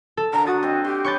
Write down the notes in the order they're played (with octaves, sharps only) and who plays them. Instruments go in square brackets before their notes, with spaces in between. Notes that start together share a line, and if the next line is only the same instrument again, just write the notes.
[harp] A4
[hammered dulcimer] D3 [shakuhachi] A#5
[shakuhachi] F#4 [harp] D#6 A6
[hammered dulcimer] C4 D#5 F#5
[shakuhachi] G4 [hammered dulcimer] C6
[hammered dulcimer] C#4 B4 [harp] C#6 G6 A6